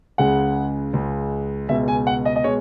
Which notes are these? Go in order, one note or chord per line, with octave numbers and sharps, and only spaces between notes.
C#2 C#3 G#3 F#5
C#2 C#3 G#3
C#2 B2 G#3 E5
G#5
F#5
D#5
D#5
B2 G#3 C#5